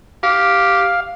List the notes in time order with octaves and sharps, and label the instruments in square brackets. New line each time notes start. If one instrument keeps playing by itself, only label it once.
[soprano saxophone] G4 [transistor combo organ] F5